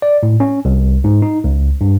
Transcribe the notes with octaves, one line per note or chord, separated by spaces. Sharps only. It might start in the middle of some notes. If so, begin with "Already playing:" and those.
D5
A2
C#4
C2
G#2
D#4
C#2
G2